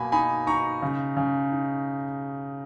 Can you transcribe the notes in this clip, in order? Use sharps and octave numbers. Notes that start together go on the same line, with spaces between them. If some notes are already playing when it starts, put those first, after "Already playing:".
Already playing: B2 A#3 G#5 B5
D#4 G#5 B5
D#4 A#5 C#6
C#3
C#3
D#4